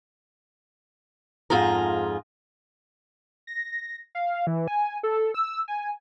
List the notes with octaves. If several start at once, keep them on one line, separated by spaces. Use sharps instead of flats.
F2 G#2 F4 G#4 A#5
A#6
F5
E3
G#5
A4
E6
G#5